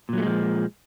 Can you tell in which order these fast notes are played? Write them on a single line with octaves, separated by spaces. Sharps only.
A#2 F#3 A3 G#3 F3